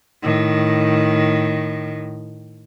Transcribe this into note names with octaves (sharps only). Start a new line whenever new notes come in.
A2 D#3